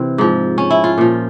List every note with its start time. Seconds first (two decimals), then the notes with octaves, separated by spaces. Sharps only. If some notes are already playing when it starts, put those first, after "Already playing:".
Already playing: C3 E3 C4
0.18 G#2 F3
0.58 C#4
0.71 E4
0.84 F4
0.98 A#2 F3